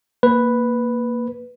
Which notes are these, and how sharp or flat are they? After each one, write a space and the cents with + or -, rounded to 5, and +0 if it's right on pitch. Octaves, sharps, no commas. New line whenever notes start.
A#3 +0 B4 +0